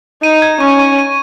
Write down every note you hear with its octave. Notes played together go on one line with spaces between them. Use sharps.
D#4 D#7
G#6
C#4 C#6
C#6
D#7